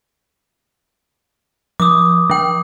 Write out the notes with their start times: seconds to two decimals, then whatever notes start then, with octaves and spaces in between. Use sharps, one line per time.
1.80 F3 D6 D#6
2.30 F3 G5